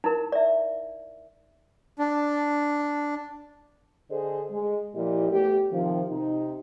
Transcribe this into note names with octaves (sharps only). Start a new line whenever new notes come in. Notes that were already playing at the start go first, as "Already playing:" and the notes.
D#4 E4 A#4
D5 E5
D4
D3 G#4 A4 C5 D#5
G#3
A#2 F3 E4 G4 D#5
E2 A3 G4
C3 D#3 F3
C3 D#4